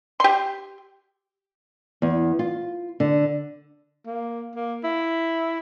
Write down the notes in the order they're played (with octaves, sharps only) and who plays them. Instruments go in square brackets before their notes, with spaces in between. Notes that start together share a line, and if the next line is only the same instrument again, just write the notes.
[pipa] G4 C6
[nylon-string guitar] E2
F4
D3
[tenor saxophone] A#3
A#3
E4